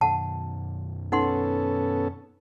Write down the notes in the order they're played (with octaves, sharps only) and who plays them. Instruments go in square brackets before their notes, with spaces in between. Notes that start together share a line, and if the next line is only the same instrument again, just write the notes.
[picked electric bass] F#2 B2 D#3 [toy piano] F#5 A5
[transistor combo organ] B3 C#4 A4 [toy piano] D#4 F#5 C6